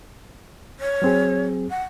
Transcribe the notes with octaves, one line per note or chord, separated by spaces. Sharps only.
C#5
F#3 C4 G#4
F#5